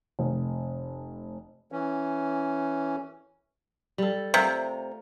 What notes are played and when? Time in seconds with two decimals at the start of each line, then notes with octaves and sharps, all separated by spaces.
0.19 F1
1.72 E3 C#4
3.98 G3 A4
4.34 C3 A3 F4 A#4